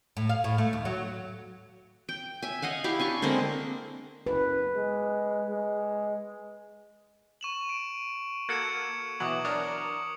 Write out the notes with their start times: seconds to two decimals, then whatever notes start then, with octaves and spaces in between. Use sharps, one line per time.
0.17 A2
0.29 F5
0.44 A2
0.58 A3
0.73 D#2
0.85 F#3
2.09 G5
2.42 E5 G#5
2.62 D#5 F5 F#5 G#5
2.84 E4 G4 F5 G5
2.99 D4 G#5 C#6
3.22 D3 G#3 A#3 C4
4.26 F#1 B4
4.76 G#3
5.49 G#3
7.41 C#6 E7 F#7
7.69 D7
8.49 A#3 F#4 A4 G#6 C#7 E7
9.20 B2 E3 F#3 D6 D#6 F#7
9.45 D4 A#4 D#6